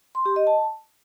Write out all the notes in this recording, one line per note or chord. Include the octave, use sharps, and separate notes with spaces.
C6
G4
D#5
A5